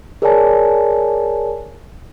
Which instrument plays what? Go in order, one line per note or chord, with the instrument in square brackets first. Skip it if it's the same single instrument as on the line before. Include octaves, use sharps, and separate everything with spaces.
[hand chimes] G#4 A#4 C#5 D5 G#5 A5